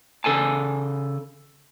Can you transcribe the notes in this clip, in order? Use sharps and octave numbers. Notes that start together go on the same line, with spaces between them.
C#3 A4 G#5 A5